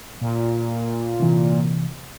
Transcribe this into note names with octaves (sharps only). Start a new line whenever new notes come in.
A#2
C3 E3